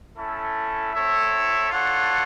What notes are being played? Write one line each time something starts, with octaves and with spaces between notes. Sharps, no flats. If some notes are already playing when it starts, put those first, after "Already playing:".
A3 C#4 E4 A4
C4 E4 A4 C#5 E5
D4 F4 A4 C#5 F#5